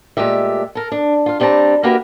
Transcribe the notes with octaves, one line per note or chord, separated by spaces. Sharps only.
A#2 G#3 A3 G4 E5
A4 A#4
D4
F4 F5
G2 G3 C4 D4 A5 A#5
A#3 F#4 G4 A#4 B4 E5